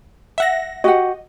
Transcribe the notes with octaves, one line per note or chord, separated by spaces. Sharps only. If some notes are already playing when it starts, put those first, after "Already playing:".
E5 F#5 A#6
F#4 G4 D#5 F#5